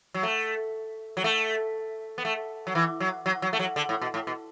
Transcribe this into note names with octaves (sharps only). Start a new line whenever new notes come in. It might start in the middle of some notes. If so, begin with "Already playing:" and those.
F#3
A3
F#3
A3
B3
A3
F#3
E3
F#3
F#3
F#3
A3
F#3
D3
A2
B2
A2
B2